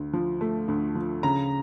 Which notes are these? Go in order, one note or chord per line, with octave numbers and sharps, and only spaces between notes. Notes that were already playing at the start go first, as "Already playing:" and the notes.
Already playing: D2
F3
A3
D2
F3
C#3 A#5